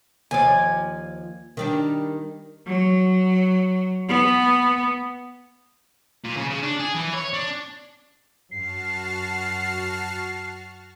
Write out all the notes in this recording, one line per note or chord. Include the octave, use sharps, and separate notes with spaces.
D#2 F3 D5 G#5
D#3 G3 D4
F#3
B3
A#2
C#3
C#3
D4
G#4
E3
C#5
D4
F#2 F#4 A5 F6 C7